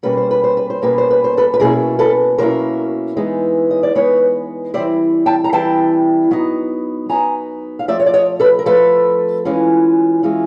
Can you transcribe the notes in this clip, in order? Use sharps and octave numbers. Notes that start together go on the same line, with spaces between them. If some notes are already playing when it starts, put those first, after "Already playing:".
B2 G3 A#3 C#4 B4
C5
B4
C5
B4
C5
B2 G3 A#3 C#4 B4
C5
B4
C5
A4 B4
B4
B2 F#3 A#3 C#4 E4 G#4 A#4
A4 B4
B2 F#3 A#3 C#4 E4 A#4 C5
E3 G#3 B3 D#4
D#5
D5
E3 G#3 B3 D#4 B4 C#5
E3 G3 C4 E4 C5 D5
G5 A5
A#5
E3 G3 C4 E4 G5 A5
F#3 B3 D#4
F#3 B3 D#4 G#5 A#5
F5
F3 A3 C4 D5 E5
C#5
D5
C#5 D#5
A4 B4
A#4
F3 A3 C4 A4 B4
E3 G#3 C#4 F4
E3 G#3 C#4 F4